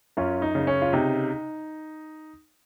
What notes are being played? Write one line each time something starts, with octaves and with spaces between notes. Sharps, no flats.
F#2 C#4 F4
D#4
C#3
C#4
F4
C3 D#4